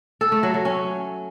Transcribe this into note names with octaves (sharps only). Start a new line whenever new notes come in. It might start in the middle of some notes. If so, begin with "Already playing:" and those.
A4
A3
F#3
F#3
C#4